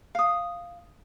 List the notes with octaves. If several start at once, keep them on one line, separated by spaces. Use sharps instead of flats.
F5 D#6